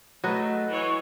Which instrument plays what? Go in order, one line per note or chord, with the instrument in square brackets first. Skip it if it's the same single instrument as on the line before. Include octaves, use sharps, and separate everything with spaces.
[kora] F#3 B4 D#5 [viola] A3
[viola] E3 C#5